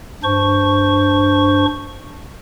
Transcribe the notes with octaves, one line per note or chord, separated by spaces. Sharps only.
G2 D4 C5 C#6